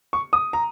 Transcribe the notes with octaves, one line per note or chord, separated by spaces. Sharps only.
C#6
D#6
A#5